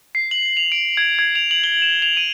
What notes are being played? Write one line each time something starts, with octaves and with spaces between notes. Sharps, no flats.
C7
F#7
F7
D7
G#6
G#6
F7
F#7
G7
E7
F7
D#7